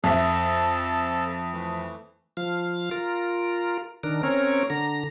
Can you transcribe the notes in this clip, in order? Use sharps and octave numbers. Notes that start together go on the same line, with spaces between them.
F2 A4 E5 A5
E3 A3
F3 F5
F4 A#4
D#3 D4 A#4
C4 C#4 A#4 C#5
D3 A#5